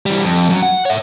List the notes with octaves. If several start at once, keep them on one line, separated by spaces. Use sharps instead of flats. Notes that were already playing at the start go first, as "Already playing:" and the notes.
E3 G3
F2
F#2 F#3
F#5
C#5 E5